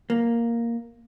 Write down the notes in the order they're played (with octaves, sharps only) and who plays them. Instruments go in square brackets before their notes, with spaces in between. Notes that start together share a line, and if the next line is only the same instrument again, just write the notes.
[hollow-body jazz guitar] A#3